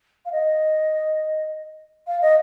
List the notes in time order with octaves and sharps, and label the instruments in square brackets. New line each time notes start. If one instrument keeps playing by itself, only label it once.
[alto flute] F5
D#5
F5
D#5